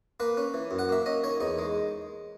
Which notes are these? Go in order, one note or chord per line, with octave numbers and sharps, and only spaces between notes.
A#3 B4
C#4
E3
F#2
F#5
A#3 E5
C#4 D#5
D#3 C#5
E2 D#4
G#3